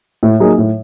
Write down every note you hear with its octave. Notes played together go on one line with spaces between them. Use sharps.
A2
F#3 A#3 D#4 G#4
A2